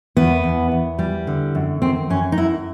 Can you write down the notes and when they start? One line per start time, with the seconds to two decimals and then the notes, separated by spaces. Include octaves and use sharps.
0.17 E2 B3
0.44 E2
0.72 E2
0.99 G3
1.27 D3
1.55 F#2
1.82 D#3 C4
2.10 F#2 C#4
2.32 D#4
2.37 F#2 E4